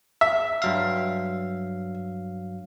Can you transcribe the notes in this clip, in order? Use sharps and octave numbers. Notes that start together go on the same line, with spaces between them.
E5
G2 F#3 F5